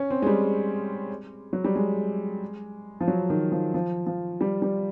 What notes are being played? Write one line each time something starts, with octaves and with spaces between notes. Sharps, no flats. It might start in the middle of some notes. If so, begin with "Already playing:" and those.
Already playing: C#4
C4
G#3
G3
F#3
G3
G#3
F3
F#3
D#3
F3
F3
F3
G3
G3